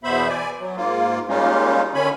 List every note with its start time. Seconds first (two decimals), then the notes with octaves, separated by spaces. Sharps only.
0.04 E2 B2 B3 C5 E5 B5
0.29 D5 G#5
0.59 F#3
0.76 G#2 A#3 F4
1.29 G3 G#3 A#3 C#4 D#4 F4
1.95 D3 D#3 C#4 C#5 G#5 B5